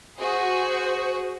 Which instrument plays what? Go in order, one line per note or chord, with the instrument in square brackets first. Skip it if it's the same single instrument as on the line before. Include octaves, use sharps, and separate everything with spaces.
[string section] F#4 G#4 [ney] C5